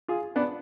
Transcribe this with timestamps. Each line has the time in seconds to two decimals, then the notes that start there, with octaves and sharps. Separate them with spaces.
0.08 F4 G#4
0.36 B3 D4